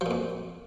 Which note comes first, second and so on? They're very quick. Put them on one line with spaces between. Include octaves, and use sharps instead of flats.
F3 A#2 F2